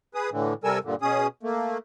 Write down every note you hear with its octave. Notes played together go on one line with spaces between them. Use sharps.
G#4 B4 D#6
A2 D3 E3
C3 G3 A4 A#4 G#5 E6
G2 A#2 D3
B2 C#4 G#4 D#6
A3 A#3